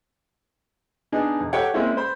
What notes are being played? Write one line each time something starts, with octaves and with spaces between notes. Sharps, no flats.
B3 D4 D#4 G#4
E1
G4 A4 C#5 F#5 G5
G#3 A#3 C4 C#4 E4
C5 B5